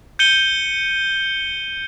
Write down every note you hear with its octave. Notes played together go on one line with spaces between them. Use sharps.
G6 C#7 D#7 G7